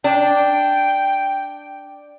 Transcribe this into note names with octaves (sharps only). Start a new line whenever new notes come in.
D4 G5